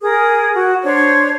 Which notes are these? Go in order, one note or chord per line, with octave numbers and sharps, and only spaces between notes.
G#4 A#4 D#6
F#4
D4 C5 C#5